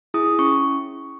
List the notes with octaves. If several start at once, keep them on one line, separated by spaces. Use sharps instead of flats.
E4 G#4 D#6
C#4 C#6